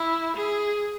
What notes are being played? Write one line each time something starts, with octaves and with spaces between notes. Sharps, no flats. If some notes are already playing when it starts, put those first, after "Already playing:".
Already playing: E4
G#4